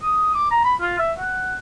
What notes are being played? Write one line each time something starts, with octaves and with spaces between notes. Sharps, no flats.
D#6
D6
A#5
B5
F4
E5
F#5